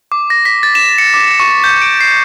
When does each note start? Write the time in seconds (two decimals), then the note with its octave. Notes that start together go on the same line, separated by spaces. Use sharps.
0.12 D6
0.30 A#6
0.45 B6
0.63 A6
0.75 E7
0.98 C#7
1.14 D6
1.40 C#6
1.64 G6
1.82 D7
2.00 C7